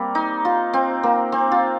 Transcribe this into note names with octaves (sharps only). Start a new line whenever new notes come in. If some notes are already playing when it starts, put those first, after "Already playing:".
Already playing: G3 A#3 C4
D#4
F4
C4
A#3
C4
F4